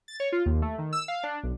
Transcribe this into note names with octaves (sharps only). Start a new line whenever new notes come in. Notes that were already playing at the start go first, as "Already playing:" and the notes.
A6
C#5
F4
D#2
A3
D#3
E6
F5
D4
B1